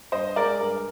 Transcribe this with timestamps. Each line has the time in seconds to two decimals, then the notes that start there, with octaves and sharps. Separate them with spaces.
0.12 G2 C5 D#5
0.36 G#3 A#4 D5
0.60 G2 A#4